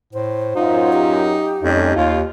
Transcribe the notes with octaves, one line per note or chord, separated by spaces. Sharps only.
A2 C5
F#2 D#4 F4
G4
F2 G3 A3 C#4 D#4
D#2 F4